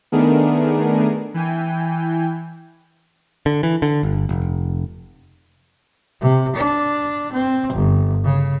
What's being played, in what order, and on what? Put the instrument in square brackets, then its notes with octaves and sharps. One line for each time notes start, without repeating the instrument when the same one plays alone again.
[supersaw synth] D#3 A3 B3 D4 G#4 A#4
E3 G5 G#5
[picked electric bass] D3
E3
D3
G1
F1
[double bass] C3
D4
C4
G1
C#3